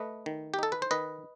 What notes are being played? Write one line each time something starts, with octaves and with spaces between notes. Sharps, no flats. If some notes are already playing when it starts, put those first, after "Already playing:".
Already playing: A3 B4 D#5
D#3
G4
D#4 A4
B4
C5
D#3 B4 D#5